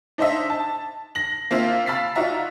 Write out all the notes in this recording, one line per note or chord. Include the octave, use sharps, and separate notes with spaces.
D4 D#4 C5 D#5 E5
A5
A#6 F#7
A#3 C4 F4 E5 F5
F5 B5 E6 A6 B6 C7
D#4 F4 F#4 D5 E5 A#5